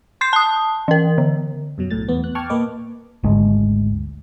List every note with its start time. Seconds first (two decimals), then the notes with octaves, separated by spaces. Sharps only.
0.21 C6 G6 C7
0.33 A5 D#6
0.88 E3 A#4
1.18 D3
1.78 F#2 B2 F#3
1.91 B1 A2 A6
2.09 E2 B3
2.24 F#6
2.35 G5 A5 C#6 D6 F6 G#6
2.49 A#2 A#3 B4 D#5 D6
3.24 G#1 D2 G#3